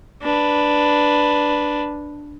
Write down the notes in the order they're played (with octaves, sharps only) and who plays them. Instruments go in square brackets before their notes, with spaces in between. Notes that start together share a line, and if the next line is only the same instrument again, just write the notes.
[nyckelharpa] D4 B4